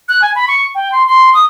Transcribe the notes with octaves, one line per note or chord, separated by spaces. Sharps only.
F#6
G#5
B5
C#6
G5
C6
C6
D#6